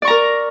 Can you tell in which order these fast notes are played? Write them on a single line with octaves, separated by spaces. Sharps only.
D5 C#6 A#5 A#4